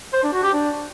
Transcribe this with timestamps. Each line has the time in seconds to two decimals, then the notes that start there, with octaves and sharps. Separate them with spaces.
0.13 C5
0.23 D4
0.33 F#4
0.43 G4
0.53 D4